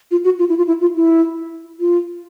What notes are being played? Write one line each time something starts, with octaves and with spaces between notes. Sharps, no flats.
F4
F#4
F4
E4
F4
E4
F4
E4
F4